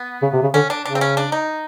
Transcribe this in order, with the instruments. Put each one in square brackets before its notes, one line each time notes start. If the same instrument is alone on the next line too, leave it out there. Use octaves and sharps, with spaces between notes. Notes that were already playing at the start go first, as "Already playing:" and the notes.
Already playing: [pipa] B3
[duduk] C#3
C3
C#3
[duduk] D3 [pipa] C#4
[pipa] D4
[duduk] C#3 [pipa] D4
[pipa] C4
C#4
D4
D#4